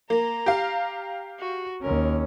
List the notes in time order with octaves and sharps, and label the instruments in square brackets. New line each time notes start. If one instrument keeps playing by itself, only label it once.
[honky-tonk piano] A#3 [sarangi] A#5
[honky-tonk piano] G4 F5
[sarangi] F#4
[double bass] D#2 C#4 [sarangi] A#4